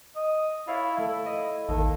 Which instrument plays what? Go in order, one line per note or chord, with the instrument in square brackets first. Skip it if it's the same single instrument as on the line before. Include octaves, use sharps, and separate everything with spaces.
[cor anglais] D#5
[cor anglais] E4 [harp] C#5 F5 A6
[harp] A3 [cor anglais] E4
[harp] D#5
[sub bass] A1 [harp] D#2 [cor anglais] A4